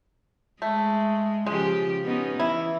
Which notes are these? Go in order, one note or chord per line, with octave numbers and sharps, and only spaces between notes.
G#3 A3
C#3 F3 G#3 G4
B3 C#4 D#4
E3 E4